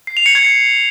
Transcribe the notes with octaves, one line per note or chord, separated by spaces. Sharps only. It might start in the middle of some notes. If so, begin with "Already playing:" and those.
C7
F7
C#7
G#6
C7